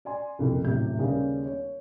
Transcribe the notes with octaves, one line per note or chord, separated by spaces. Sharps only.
D5 G#5 C6
F#1 C2 F2
D#1 A1 C3 F#3 G4 G6
D#2 C#3 G3 B3 C#4
C#5